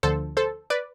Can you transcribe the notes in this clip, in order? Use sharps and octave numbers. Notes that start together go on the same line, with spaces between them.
D2 D3 F3 A4 C5
A4 C5
B4 D5